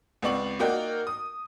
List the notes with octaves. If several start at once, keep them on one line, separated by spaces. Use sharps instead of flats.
C#2 B3 C4 D5 C#6 F#7
A#3 D#4 F#4 A#4 D5 G5
D#6